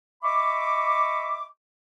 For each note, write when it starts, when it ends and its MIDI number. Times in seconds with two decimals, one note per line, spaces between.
0.23 1.46 75
0.23 1.46 76
0.23 1.46 83
0.23 1.46 85
0.23 1.46 86